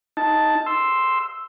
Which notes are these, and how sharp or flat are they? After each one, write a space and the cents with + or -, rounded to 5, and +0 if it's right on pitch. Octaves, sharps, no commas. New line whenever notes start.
D#4 +15 A5 +0
C6 +0 E6 +0